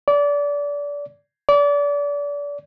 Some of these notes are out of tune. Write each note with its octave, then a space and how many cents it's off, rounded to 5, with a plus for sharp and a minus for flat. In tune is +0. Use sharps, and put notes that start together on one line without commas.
D5 -25
D5 -30